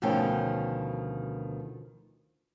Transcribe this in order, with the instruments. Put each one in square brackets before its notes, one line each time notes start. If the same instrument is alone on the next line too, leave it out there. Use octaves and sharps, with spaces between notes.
[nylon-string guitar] D2 B2 D#3 F3 C#4 G5